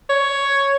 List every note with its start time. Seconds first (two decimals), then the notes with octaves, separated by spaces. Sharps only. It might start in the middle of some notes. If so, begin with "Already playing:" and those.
0.09 C#5